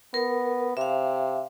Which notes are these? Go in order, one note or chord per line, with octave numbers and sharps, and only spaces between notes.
B3 A#4
C3 E5 F5